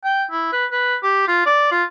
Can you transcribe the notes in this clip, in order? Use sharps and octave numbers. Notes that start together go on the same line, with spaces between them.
G5
E4
B4
B4
G4
F4
D5
F4